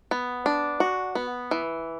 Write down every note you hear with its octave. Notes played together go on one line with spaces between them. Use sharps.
B3
D4
F#4
B3
E3